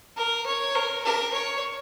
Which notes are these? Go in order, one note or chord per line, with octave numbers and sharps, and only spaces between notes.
A#4
C#5
A#4
A#4
C#5